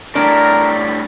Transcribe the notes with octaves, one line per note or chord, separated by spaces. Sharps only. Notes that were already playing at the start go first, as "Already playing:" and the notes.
A2 G3 D4 A#4